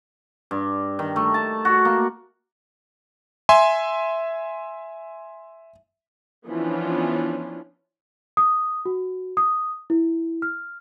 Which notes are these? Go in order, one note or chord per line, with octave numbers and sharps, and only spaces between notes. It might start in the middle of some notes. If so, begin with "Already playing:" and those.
G2
D#3
A3
A5
F#4
A#3
E5 G#5 C6
E3 F3 B3 C#4 D4 F4
D#6
F#4
D#6
E4
F6